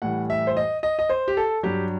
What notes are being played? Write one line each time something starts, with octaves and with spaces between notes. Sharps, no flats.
A2 E3 G3 F#5
E5
C5
D#5
D#5
D#5
C5
G4
A4
G2 F#3 G4